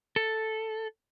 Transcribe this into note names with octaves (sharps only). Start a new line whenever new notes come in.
A4